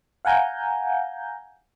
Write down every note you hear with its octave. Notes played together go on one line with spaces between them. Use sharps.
F5 F#5 G#5 A#5 G6